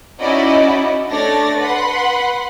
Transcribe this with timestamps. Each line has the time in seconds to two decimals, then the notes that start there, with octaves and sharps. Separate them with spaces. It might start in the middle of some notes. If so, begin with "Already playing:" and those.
0.20 C#4 D#4 E4 F#4 D5 D#5
1.11 A3 D4 C#5 D5 A6 A#6
1.59 B4 F#5 B5 C6